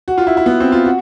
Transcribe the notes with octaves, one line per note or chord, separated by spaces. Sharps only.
F#4
F4
E4
E4
B3
C4
F4
F#4